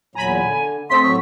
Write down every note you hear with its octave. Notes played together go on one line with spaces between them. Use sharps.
E2 A#2 F#3 G#5 A#5 B5
D3
A3 C4 A4 D#5 C6 B6
A2 F#3 C#6